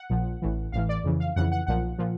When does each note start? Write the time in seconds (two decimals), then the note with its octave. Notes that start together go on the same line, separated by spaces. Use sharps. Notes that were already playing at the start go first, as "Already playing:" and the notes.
Already playing: F#5
0.10 A#1 A#2 F3
0.42 A1 A2 E3
0.72 A1 A2 E3 F5
0.89 D5
1.04 F2 C#3 E3
1.20 F5
1.36 F2 C#3 E3 F#5
1.52 F#5
1.67 B1 A#2 F3 F#5
1.98 A#2 F3